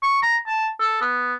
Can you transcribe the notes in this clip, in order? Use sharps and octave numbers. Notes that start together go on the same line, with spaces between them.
C#6
A#5
A5
A4
B3